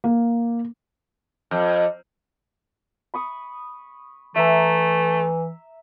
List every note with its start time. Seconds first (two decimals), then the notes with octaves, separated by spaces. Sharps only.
0.04 A#3
1.51 F2
3.14 B5 C#6 D#6
4.36 E3 A3 E5 A#5